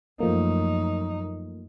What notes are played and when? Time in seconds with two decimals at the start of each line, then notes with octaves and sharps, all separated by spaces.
0.20 F#2 F3 A3 A#3 D#4